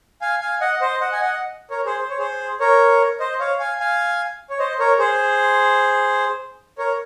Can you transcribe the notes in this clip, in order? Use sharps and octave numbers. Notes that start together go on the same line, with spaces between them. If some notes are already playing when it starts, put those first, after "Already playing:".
F5 G#5
F5 G#5
D#5 F#5
C5 D#5
D#5 F#5
G#5
D#5 F#5
A#4 C#5
G#4 C5
C5
C#5
G#4 C5
A#4 C#5
C5 D#5
C#5 F5
F5 G#5
F5 G#5
C#5
C5 D#5
A#4 C#5
G#4 C5
A#4 C#5